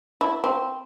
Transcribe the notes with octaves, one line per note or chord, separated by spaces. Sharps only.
E4
C4